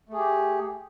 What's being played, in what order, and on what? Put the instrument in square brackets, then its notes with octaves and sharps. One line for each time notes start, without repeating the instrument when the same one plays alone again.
[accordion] A3
G#4
G4